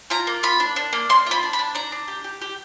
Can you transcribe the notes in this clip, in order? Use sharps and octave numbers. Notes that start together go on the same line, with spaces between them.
F4 A#5
A#3
F4 B5
D4
D4
A#3
A#3 C6
F4 B5
D4
B5
D4
D4 A#5
D4
G4
G4
G4